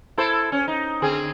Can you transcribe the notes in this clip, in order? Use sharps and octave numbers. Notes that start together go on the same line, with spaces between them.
E4 A4 C5
C#4
D#4
D3 C4 G#4